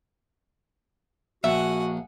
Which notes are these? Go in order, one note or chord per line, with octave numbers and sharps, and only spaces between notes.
A#1 F#4 E5 F#5 G#5